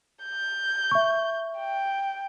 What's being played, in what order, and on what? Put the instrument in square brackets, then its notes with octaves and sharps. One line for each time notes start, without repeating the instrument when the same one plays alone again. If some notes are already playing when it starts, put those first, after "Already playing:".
[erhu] G6
[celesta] E5 C#6
[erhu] G5